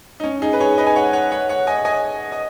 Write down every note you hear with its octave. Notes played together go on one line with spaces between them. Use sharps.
D#4
C#4
D#4 G#4
B4
G#4 C#5
B4 D#5
G#5
C#5 F#5
C#5 F#5
C#5 F#5
C#5 F#5
D#5 G#5
D#5 G#5
D#5